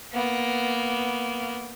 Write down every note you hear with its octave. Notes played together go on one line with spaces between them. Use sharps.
A#3 B3